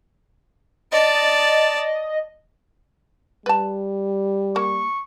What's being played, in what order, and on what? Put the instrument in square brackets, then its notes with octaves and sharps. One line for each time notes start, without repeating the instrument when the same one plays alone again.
[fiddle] D5 A5 [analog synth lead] D#5
[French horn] G3 [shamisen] B4 A5
[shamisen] A#3 [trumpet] C#6